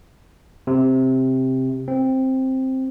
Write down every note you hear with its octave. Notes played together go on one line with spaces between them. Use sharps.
C3
C4